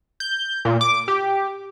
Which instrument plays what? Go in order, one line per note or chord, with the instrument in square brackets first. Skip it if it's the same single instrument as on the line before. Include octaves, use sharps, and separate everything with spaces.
[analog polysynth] G6
A#2
D6
G4